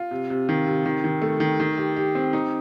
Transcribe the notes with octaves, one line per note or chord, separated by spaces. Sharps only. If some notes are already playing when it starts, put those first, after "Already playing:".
Already playing: F4
C3
C3
D#3
C3
D#3
D#3
A3
D#3
D#3
G4
G4
C4
D#4